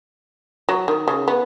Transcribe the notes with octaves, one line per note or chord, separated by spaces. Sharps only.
F#3
D#3
C#3
B3